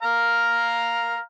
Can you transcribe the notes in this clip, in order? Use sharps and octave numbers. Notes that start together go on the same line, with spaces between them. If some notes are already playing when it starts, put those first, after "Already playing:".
F5 A#5 F6